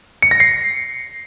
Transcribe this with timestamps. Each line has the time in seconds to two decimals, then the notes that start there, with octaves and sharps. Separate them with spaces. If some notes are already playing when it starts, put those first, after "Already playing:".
0.22 C#7
0.31 A#6
0.40 C7